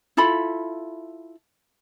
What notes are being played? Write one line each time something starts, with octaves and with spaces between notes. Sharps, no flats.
E4 F4 A4 B5